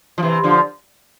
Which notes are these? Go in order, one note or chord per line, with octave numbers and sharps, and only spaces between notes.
F3
C3 E3
D3 F3